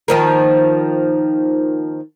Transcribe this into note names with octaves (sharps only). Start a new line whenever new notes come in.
D#3 F3 A#3